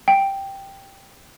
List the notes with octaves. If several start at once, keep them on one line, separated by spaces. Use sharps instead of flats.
G5